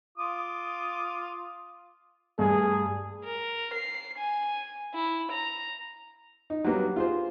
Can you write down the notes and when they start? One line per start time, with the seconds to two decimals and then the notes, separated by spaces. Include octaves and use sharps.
0.18 F4 D6 D#6
2.39 G2 A3 G#4
3.25 A#4
3.74 C7
4.18 G#5
4.94 E4
5.32 A#5
6.50 D#4
6.64 F#3 G3 A#3 B3 D4
6.96 F4 G#4 C5